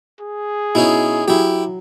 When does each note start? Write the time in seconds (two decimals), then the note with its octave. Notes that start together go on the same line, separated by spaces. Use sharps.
0.20 G#4
0.75 B2 C#4 D#4 E4
1.28 F#3 E4 G4